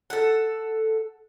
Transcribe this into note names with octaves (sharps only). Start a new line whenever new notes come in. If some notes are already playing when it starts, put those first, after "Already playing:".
A4 F#5